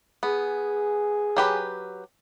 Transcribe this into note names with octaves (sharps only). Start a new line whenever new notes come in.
B3 G#4
F#3 G4 B4